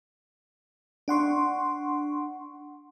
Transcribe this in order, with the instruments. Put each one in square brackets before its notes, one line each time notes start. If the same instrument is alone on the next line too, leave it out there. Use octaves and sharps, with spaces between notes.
[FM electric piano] D4 F#5 C6 C#6